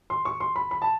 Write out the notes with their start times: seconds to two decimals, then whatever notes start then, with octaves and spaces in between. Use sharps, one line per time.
0.10 C6
0.25 C#6
0.40 C6
0.56 B5
0.71 B5
0.82 A5